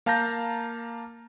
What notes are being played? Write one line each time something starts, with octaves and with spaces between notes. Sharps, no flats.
A#3 F5 A5 A#5 G6 A#6